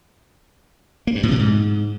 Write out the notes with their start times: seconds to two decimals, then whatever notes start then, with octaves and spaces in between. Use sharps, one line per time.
1.07 A#3
1.15 G2
1.23 A2
1.31 C3
1.39 G#2